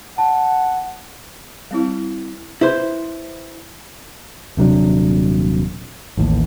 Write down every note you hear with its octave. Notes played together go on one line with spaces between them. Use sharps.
F#5 A5
G3 C4 E4
E4 B4 C5
D#1 C3 F#3 D4
A1 D#2 A2